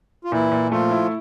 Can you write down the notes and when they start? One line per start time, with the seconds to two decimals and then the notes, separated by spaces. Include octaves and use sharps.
0.24 F4
0.32 A#2 E3 E4
0.52 A#2
0.71 F3 A3 F4
0.91 E4